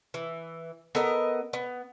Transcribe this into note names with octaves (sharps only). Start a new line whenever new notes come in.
E3
B3 A4 A#4 D#5
B3